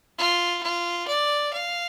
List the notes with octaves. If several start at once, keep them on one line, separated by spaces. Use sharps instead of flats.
F4
F4
D5
F5